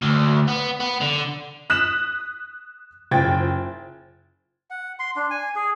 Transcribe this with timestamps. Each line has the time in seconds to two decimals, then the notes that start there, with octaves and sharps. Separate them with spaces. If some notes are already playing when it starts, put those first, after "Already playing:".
0.02 D2
0.48 B3
0.80 B3
1.01 D3
1.70 D#6 F#6 B6 E7
3.11 F#1 F3 G5 G#6 A6
4.70 F#5
4.99 C6
5.16 D4
5.30 G#5
5.56 G#4